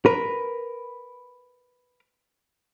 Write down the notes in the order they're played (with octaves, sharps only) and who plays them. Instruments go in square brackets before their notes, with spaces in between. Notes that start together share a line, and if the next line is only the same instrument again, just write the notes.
[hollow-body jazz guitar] A#4 B4